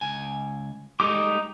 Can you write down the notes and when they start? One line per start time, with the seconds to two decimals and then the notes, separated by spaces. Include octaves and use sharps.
0.01 C#2 G#5
1.00 G#3 A3 D#4 G4 D6